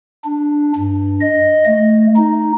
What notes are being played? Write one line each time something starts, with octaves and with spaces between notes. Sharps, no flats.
D4
G2
D#5
A3
D#4